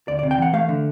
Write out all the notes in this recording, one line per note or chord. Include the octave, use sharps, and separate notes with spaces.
D2 D5
C3 D5
G5
E3 F#5
A3 F5
D3